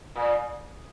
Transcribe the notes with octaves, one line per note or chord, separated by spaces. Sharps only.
A#2